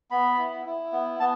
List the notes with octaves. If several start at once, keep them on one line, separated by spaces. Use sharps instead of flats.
B3 B5
E4
E4
B3
B3 A5